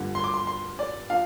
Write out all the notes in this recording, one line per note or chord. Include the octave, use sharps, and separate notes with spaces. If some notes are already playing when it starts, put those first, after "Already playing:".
Already playing: G2 D3 F3
C6
D6
C6
C6
D5
F3 D4 F5